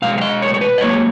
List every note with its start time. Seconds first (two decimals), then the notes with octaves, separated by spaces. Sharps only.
0.02 B2 G#3 F5
0.18 F5
0.21 D#5
0.42 C#5
0.54 C#5
0.61 B4
0.78 D#5
0.81 G#2 F#3 A#3 C#5